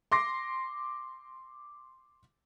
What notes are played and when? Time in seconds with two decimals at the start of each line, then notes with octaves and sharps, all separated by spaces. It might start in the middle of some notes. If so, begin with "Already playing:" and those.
0.12 C6 D6 A#6 C7